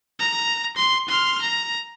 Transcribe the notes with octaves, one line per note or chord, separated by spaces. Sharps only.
A#5
C6
C6 F6
A#5